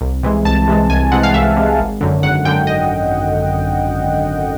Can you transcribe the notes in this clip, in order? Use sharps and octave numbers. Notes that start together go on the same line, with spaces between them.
C2
C3 E3 G#3
C2 A5
C3 E3 G#3
C2 G#5
C3 E3 G#3 F#5
F5
C2 E5
C3 E3 G#3
G#1
F#2 D3
G#1 F#5
F#2 D3 G5
D#5